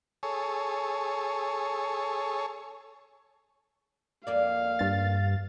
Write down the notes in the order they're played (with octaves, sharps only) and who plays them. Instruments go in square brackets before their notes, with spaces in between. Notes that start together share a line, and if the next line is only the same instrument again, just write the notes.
[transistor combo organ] G#4 A4 C#5
[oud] F2 A#3 D5 [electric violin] F5
[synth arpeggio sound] G2 A6